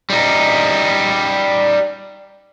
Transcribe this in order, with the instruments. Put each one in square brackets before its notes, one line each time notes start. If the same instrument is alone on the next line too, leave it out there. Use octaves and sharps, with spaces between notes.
[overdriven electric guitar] G3 D#4